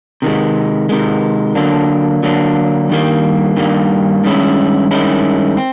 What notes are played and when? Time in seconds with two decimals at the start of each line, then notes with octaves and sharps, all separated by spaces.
0.22 C3 D#3 G#3
0.89 C3 D#3 G#3
1.55 D3 F#3 A#3 D4
2.23 D3 F#3 A#3 D4
2.89 G2 D#3 G3 A#3
3.57 G2 D#3 G3 A#3
4.24 G2 D#3 G#3 C#4 E4
4.91 G2 D#3 G#3 C#4 E4
5.57 C4